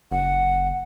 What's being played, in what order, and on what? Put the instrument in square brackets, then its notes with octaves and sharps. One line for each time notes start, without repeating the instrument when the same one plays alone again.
[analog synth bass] F#1 [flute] F#5